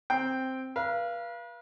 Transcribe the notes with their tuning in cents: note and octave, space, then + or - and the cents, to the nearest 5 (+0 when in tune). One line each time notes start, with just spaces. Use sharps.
C4 +0 G5 +5
B4 -40 F5 -20